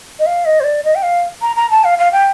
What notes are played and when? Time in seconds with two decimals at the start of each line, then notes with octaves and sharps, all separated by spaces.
0.19 D#5
0.26 F5
0.45 D#5
0.60 C5
0.64 D5
0.84 D#5
0.95 G5
1.03 F5
1.42 A#5
1.56 A#5
1.71 A5
1.84 F5
1.99 F5
2.12 G5